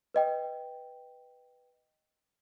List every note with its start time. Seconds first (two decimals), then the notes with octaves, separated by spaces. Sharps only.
0.14 B4 D#5 G5